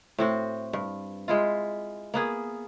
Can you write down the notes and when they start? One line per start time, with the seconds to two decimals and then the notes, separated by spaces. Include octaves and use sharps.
0.18 A2 C4 F#4
0.73 G2
1.28 G#3 E4 F4
2.14 A#3 B3 G#4